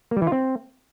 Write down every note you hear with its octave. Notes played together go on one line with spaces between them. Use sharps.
A#3
G3
E3
F4
C4